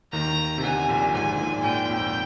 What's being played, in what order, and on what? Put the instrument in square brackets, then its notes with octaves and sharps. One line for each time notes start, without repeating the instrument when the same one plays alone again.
[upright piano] D#2 D#3 [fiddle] A#5
[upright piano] C3
[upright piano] D2 D3 [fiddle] G#5
[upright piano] A#1 A#2
[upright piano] G#1 G#2 [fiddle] G#5
[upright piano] G#2
A#1 A#2
[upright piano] A#1 A#2 [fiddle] G5
[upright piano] F2 F3